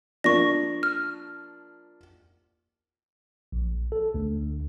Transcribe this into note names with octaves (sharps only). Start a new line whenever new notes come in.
F3 A#3 D4 C#6 A#6
F6
A#1
A4
D2